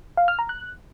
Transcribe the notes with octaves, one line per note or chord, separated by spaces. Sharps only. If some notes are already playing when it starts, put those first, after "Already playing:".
F5
F6
A#5
F#6